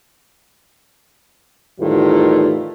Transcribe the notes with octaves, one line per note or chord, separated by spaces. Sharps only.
E2 A2 D#3 G3 F4